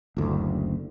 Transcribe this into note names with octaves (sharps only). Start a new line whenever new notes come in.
F#1 D2